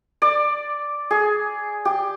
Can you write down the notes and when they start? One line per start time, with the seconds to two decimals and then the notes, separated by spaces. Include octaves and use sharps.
0.22 D5
1.11 G#4
1.85 G4